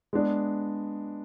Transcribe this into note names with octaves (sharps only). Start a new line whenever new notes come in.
G#3 B3 D4 G#4 D5